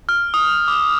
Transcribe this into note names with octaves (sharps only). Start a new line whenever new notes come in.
F6
D#6
D6